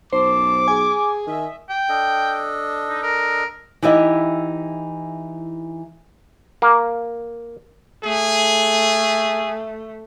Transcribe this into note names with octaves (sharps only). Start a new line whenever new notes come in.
B1 F#2 C5 A5 D6
G#4 G#5
D#3 D#5 E5
G5
D4 A4 D#5
D#4
A#4
E3 D#4 E4 G4 E5
A#3
A3 G#4